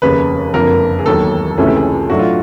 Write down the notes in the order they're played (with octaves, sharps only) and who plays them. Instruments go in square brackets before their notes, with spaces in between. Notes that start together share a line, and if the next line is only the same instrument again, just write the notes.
[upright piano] F1 D#2 C#3 [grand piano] B4
[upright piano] F#1 F2 D3 [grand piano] A#4
[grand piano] G#4
[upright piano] E1 D#2 D#3 F#3 [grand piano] A4
[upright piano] C#2 C3 E3 A3 C#4 [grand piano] G#4
[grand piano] G4
G#4
[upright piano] A2 F#3 A3 D4 [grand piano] F#4
[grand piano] F4